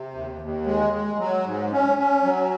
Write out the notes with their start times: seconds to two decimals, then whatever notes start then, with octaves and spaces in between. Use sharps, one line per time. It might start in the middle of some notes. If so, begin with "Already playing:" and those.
Already playing: C3
0.14 D#2
0.41 D#2
0.66 G#3
0.93 G#3
1.19 F#3
1.45 G#2
1.72 C#4
1.98 C#4
2.24 F#3